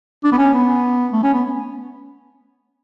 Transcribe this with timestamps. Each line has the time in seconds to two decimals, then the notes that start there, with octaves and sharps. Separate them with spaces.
0.24 D4
0.32 B3
0.38 C#4
0.53 B3
1.13 A3
1.23 C#4
1.33 B3